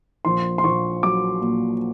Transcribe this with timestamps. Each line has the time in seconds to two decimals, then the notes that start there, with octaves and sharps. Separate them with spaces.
0.25 A#1 C6
0.58 C6
0.64 A#1 C#6
1.03 F#3 D6
1.41 A#2